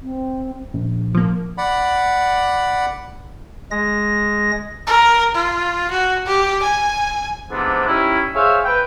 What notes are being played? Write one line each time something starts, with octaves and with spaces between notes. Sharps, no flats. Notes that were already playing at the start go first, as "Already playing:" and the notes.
C4
A#1
F3 A#3
D5 F#5 B5
G#3 A#6
A#4
F4
F#4
G4
G#5
G#2 C3 F3 B3 D4
G3 C#4 D#4 E4
G#4 C5 C#5 E5 F5
B4 G5